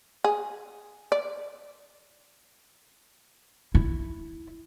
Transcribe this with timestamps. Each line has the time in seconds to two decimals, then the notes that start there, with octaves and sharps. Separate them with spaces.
0.24 G#4
1.12 D5
3.75 E4